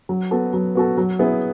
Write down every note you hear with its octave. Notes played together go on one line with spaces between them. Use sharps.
F#3
B3 F#4 A4
F#3
B3 F#4 A4
F#3
B3 E4 G#4